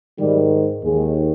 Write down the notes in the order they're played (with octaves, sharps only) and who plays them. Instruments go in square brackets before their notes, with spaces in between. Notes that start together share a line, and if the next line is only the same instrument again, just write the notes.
[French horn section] G#2 D#3 G3
D#2 D#3 G#3